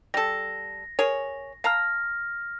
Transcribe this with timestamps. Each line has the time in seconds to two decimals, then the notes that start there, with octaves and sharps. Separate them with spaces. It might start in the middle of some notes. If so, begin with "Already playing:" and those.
0.14 G3 A4 A#6
0.99 G#4 A#4 C#5
1.64 F5 A5 A#5 F6 A#6